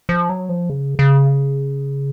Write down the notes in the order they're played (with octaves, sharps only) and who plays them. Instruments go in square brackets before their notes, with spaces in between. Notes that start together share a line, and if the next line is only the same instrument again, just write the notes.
[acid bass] F3
F#3
F3
C#3
C#3